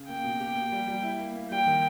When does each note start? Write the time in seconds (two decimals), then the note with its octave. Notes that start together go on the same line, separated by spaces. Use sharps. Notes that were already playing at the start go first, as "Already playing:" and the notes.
Already playing: C#3
0.08 A#3 G5
0.24 B2
0.40 G4
0.55 A#3
0.72 G3
0.88 G3
1.03 E4
1.19 A#3
1.35 A#3
1.50 G3 G5
1.66 D#3